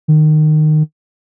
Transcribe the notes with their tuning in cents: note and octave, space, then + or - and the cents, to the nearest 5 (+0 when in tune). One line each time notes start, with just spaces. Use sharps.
D#3 -20